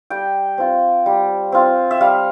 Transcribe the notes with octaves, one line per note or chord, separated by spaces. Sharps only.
G3 G5
C4 F4
G3
C4 F4
E5
G3 F5